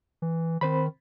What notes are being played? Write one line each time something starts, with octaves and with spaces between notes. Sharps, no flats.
E3
D#3 C4 C5 B5